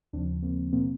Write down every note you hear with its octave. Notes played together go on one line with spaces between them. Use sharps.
D#2 C#3 F3 C4 D4
A#3 C4
B2 A#3 C4